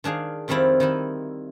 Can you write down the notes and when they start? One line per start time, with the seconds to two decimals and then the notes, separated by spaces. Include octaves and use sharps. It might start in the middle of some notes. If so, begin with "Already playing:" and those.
0.04 D#3 D4 G#4 F5
0.48 F2 D#3 G3 C4 E4 F4
0.80 D#3 D#4 E4